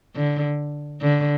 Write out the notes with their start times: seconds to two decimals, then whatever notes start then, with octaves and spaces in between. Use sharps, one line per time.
0.16 D3
1.01 D3